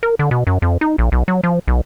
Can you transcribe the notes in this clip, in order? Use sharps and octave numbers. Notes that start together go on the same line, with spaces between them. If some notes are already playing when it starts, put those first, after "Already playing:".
A#4
D3
B2
F#2
F2
D#4
A#1
B1
F#3
F3
B1